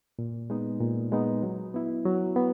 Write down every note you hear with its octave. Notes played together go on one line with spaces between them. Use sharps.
A#2
G#3 B3 D#4
A#2
G#3 B3 D#4
F#3
B3 E4
F#3
B3